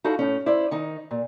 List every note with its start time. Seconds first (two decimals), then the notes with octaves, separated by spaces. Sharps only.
0.04 D#4 E4 F#4 A4 F5
0.19 A2 C#4
0.46 E4 C5 D5
0.71 D#3 D#4
1.11 A#2